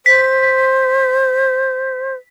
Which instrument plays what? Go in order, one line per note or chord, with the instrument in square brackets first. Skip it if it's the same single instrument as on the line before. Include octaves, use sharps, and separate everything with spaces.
[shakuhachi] C5 [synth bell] B6